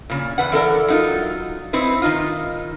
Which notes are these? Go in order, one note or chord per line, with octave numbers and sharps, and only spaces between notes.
A#2 C#3
E2 B4 F#5
E3 A4 A#4 D5
F#3 D#4 F4
C4 D#4 E4 B4
D#3 D#4 F4